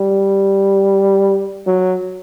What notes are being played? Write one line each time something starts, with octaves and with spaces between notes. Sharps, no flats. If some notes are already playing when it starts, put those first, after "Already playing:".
Already playing: G3
F#3